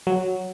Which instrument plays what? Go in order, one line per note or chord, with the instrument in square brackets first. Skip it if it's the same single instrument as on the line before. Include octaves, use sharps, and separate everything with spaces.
[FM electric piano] F#3